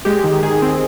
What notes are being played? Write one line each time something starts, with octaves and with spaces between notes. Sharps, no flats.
G#3 G4
D#3
D#3 G#4
C4